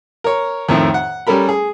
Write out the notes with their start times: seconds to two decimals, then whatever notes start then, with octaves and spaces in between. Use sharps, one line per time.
0.24 A#4 C#5
0.69 F2 A2 D#3
0.94 F#5
1.27 G3 C#4 A4 A#4 B5
1.49 G#4